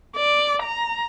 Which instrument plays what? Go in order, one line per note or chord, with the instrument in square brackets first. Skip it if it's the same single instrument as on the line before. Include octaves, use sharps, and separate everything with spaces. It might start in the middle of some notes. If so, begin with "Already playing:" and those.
[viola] D5
A#5